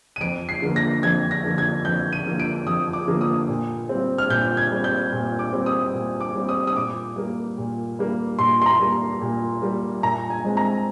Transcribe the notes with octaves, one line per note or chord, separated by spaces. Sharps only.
D#7
F2 D7
C7
D3 F3 A#3
A#6
F2 G#6
A#6
D3 F3 A#3
G#6
F2 G6
D#7
D3 F3 A#3
D7
F2 D#6
D6
D3 F3 A#3
D#6
A#2
G3 C4
F6
A#2 G6
G#6
G3 C4
G6
A#2
D6
G3 C4
D#6
A#2
D6
G3 C4
D#6
D#6
A#2 D6
G3 A#3
A#2
G3 A#3
A#2 C6
C6
A#5
G3 A#3
A#2
G3 A#3
A#2 A#5
G#5
G#3 C4
A#5